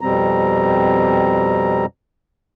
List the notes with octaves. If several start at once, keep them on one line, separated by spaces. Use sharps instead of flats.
F2 B2 G3 C4 A#5